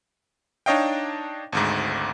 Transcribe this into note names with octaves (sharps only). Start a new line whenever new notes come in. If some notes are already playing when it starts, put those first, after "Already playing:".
D4 D#4 C#5 D#5 F5 G5
G#1 D2 G#2